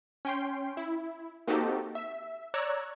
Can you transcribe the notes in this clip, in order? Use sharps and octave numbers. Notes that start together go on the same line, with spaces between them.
C#4 G5 C6
E4
A#3 C4 D#4 F#4 G4 A4
E5
C#5 D5 A#5 E6 F#6 G#6